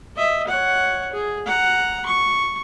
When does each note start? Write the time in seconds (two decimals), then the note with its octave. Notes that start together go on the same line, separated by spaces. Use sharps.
0.16 D#5 E5
0.47 C#5 F#5
1.12 G#4
1.46 F#5 A#5
2.06 C#6